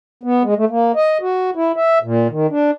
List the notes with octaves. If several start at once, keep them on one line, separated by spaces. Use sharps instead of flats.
B3
G#3
A3
A#3
D#5
F#4
E4
E5
A#2
D#3
D4